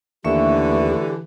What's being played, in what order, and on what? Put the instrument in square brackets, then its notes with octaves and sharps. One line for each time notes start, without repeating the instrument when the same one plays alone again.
[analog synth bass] D#2 [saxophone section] D3 E3 [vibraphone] A3 E5 C#6 [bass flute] G4